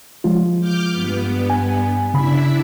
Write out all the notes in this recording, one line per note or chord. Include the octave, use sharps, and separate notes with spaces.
F3 G#3 F4
D6 F6 G6
G2 B3
G#5
C#3 D4 E4 E5 B5